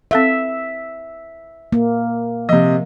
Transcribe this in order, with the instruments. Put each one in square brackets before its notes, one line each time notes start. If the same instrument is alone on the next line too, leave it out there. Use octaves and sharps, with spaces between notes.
[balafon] C4 A4 F5 [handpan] E5
[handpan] A#3
[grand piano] C3 D#5 [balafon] F3